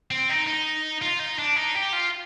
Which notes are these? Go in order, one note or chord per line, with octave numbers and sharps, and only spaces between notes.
C4
D#4
D#4
F4
D#4
D4
D#4
G4
F4